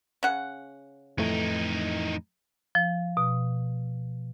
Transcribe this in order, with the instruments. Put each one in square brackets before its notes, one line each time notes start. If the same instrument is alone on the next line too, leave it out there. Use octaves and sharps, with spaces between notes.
[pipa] C#3 F#5
[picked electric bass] F2 A2 A3 [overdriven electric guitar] E3 D#4
[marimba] F3
B2